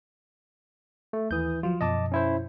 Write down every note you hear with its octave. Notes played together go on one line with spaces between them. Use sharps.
A3
D#2 E3 D#6 G6
F3 F#3 F4
F#2 B2 F3 D#5 A5 D6
C#4 E4 C5